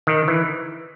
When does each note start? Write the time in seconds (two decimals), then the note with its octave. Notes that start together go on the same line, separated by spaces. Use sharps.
0.07 D#3
0.28 E3